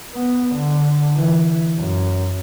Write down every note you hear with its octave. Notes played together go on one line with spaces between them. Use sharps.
B3
D3
E3
F#2